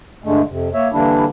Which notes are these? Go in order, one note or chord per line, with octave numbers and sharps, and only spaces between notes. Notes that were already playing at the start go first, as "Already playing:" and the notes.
G2 D3 G#3 A3
F2 C3
A#3 C#5 E5
D3 E3 G3 A#3 D4 E4